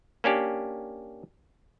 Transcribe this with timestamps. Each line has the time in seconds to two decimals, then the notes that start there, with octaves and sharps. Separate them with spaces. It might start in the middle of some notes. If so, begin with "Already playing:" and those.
0.24 A#3 C#4 D4 G4